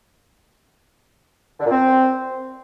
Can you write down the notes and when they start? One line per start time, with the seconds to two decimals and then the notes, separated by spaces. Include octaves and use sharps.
1.60 D3
1.65 A#2
1.71 C4